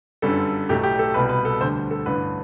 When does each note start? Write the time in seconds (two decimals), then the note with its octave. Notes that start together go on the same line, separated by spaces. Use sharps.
0.22 G1 F#2 D3 G3 A4
0.69 B1 A2 F#3 A3 G4
0.83 G4
0.99 A4
1.14 C2 B2 G3 B4
1.29 B4
1.45 A4
1.60 D2 D3 G3 C5
1.91 A4
2.06 A1 G2 D3 B4